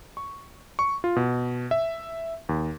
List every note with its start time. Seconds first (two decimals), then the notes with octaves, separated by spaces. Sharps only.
0.17 C#6
0.79 C#6
1.04 F4
1.16 B2
1.71 E5
2.49 D#2